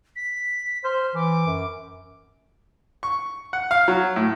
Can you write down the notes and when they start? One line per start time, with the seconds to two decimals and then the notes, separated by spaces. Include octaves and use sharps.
0.16 B6
0.84 C5 F6
1.15 E3 D6
1.46 F#2
3.03 C#6
3.53 F#5
3.71 F5
3.88 F#3
4.16 A2